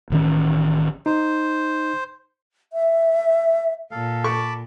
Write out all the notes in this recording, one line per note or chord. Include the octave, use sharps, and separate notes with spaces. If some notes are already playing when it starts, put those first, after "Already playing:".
A1 D#3 C#4
D#4 C5
E5
A#2 A4 F5
A4 A5 B5 C#6 D6